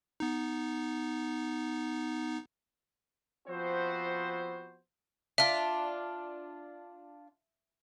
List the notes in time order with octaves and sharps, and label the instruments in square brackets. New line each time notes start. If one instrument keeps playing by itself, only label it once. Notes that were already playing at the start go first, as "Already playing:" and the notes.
[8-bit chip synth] B3 D#4
[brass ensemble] F3 B3 C4 F#4 C5
[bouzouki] D4 F4 [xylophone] E5